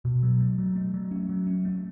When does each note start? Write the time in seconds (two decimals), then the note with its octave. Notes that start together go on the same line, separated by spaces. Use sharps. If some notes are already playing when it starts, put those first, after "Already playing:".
0.05 B2
0.23 F#3
0.40 A3
0.58 F#3
0.76 A3
0.94 F#3
1.11 C#4
1.29 F#3
1.47 C#4
1.65 A3